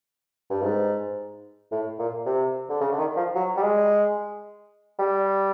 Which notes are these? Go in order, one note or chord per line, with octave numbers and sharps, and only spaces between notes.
G2
G#2
A2
A#2
C3
D3
C#3
D3
D#3
F3
F#3
G3
G#3
G3